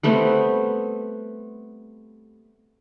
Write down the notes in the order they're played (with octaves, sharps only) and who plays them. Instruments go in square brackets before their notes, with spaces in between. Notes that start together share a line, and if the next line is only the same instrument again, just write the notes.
[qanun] G3 A3 B3 C4